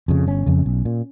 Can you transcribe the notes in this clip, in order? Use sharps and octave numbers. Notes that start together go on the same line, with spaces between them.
F2 C#3
G1 C#4
F2 C#3
B1
A#2